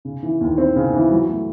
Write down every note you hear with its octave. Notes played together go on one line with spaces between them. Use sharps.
C#3
E3
D#2
C4
C#3
E3
F#3
A3